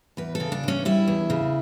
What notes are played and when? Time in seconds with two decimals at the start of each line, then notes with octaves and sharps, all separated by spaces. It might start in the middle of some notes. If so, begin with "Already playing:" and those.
0.17 E2 B4
0.35 A4
0.40 C#3
0.52 D4
0.63 E2 C#4
0.85 G3 E4
1.08 E2
1.30 C#3